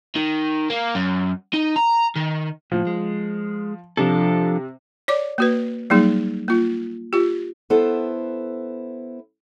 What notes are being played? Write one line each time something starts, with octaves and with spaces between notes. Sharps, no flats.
D#3
A#3
F#2
D#4
A#5
D#3
A2 F3
G#3
C3 F3 D4 A4
C#5 D5 D6
A#3 F#4 B4
F#3 G3 A#3 D#4 G#4
A#3 F4
F4 G4
B3 E4 A4 B4 C5